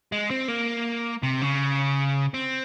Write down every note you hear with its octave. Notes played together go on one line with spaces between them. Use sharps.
G#3
C4
A#3
C3
C#3
C4